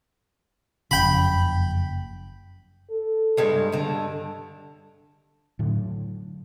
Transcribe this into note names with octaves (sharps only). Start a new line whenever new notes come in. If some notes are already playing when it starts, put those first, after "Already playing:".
F#1 F2 C#3 G5 B5
A4
G2 G3 G#3
G2 D3
A2 D3 F#3